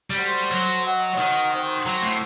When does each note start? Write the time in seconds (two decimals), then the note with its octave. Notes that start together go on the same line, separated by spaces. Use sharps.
0.10 G3
0.18 F#4 A4 C5
0.51 F#3
0.85 F#4 C5 D#5 F#5
1.18 D#3
1.52 C4 F#4 C5 F#5
1.86 F#3
2.02 A2